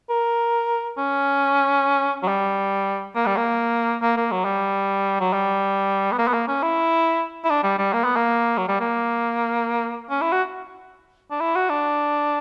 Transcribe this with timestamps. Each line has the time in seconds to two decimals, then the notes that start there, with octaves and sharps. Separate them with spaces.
0.10 A#4
0.98 C#4
2.23 F#3
2.28 G3
3.15 A#3
3.26 G3
3.37 A#3
4.02 A#3
4.17 A#3
4.31 F#3
4.45 G3
5.20 F#3
5.33 G3
6.12 B3
6.19 A#3
6.27 B3
6.33 A#3
6.48 C#4
6.62 E4
7.44 E4
7.50 D4
7.63 G3
7.79 G3
7.93 A#3
8.04 B3
8.16 A#3
8.57 F#3
8.68 G3
8.80 A#3
10.10 C#4
10.21 E4
10.32 F#4
11.31 D4
11.40 E4
11.56 F#4
11.70 D4